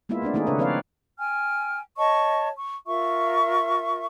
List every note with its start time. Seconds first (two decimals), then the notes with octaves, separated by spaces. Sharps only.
0.09 G#3 A#3 B3 E4 F4 E5
0.22 A3 C4 D4 D5
0.34 D#3 A3 A#3 D#4 E4 G#4
0.47 C#3 D4 A4 B4 C#5
0.58 F3 C4 B4 C#5 D5 F5
1.18 G5 G#5 F6
1.97 C#5 D#5 A5 C#6
2.57 C#6
2.87 F4 A#4 E5 C#6